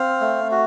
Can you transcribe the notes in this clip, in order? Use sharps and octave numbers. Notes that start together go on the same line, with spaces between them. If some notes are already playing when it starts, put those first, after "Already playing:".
Already playing: C4 F5
A3
F#4